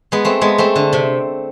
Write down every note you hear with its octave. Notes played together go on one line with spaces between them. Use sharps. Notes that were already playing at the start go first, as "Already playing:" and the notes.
G#3 B3
A3 C4
G#3 B3
A3 C4
D3
C3